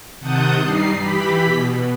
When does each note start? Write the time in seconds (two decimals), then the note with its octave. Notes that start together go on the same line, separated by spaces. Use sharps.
0.20 C3 D#3 F#5 A5 D#6 G6
0.61 G2 G3 D#4 C7
0.98 E3 G4 B5 B6
1.45 B2